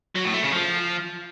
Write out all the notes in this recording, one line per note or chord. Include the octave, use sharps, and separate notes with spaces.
F#3
A2
A3
C#3
F3